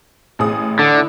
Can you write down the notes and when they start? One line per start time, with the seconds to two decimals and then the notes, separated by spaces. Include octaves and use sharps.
0.39 A1 G#4 D#6
0.79 D3
0.95 E4